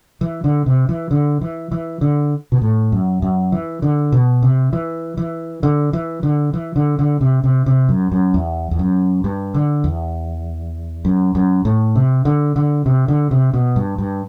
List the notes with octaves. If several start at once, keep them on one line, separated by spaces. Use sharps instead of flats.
E3
D3
C3
E3
D3
E3
E3
D3
B2
A2
F#2
F#2
E3
D3
B2
C3
E3
E3
D3
E3
D3
E3
D3
D3
C3
C3
C3
F#2
F#2
E2
E2
F#2
G2
D3
E2
F#2
F#2
A2
C3
D3
D3
C3
D3
C3
B2
G2
G2